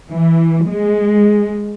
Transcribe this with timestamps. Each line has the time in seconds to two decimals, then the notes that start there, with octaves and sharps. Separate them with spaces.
0.10 E3
0.67 G#3